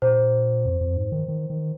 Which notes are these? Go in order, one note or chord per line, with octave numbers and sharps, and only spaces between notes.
A#2 C5
F2
F2
G#2
D#3
D#3
D#3